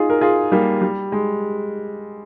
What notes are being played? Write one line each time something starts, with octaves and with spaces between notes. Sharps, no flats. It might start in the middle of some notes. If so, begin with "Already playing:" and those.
Already playing: D#4 F4 G#4
A#4
F4 G#4
G3 A#3
G3
G#3